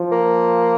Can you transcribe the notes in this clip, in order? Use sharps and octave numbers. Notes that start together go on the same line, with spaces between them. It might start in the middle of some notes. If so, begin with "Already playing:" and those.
Already playing: F3
A#3